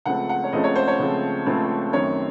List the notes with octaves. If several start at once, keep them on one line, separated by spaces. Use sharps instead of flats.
C#2 C#3 F3 A3 C4 F#5
F#5
C#5
C#2 C#3 F3 A3 C4 D#5
C#5
C5
C#5
C#2 C#3 F3 A3 C4
C#2 C#3 F3 A3 C4
F#2 D#3 A3 C4 C#5